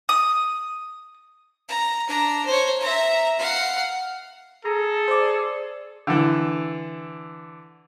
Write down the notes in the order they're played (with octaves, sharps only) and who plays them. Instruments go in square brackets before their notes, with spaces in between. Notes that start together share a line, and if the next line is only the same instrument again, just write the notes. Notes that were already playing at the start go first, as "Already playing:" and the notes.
[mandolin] D#6
[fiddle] A#5
D4 A#5
C5 C#5
E5 A#5
F5 F#5
[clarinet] G#4 [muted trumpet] A4 [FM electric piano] A#5
[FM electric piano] C5 D5
[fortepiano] D3 E3